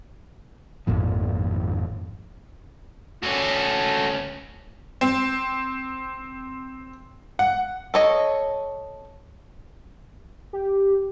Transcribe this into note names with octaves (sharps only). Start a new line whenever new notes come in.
G#1 F2 A#2 F3
D2 C#4 F#4 A4
C4
F#5
A4 C#5 D#5
G4